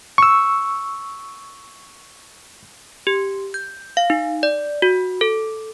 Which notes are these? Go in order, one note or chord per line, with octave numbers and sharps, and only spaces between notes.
C#6 E6
G4
G6
F5
D#4
D5
F#4
A4